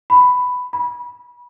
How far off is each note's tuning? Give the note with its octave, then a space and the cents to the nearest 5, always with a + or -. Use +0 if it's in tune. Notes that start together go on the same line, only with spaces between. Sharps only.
B5 +10
B5 -25